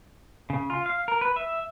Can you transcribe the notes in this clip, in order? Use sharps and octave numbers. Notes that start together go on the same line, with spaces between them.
C#3
F4
F5
A#4
B4
E5